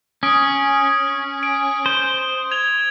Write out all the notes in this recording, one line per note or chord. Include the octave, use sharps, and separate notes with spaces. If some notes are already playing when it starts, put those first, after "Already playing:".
C#4 D#6 D7
D7
C5
G#6 F7